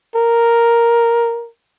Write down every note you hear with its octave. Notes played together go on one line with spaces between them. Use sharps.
A#4